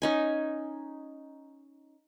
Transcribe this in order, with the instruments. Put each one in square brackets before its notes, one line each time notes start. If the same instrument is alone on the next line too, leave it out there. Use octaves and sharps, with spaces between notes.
[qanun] C#4 D#4 G#5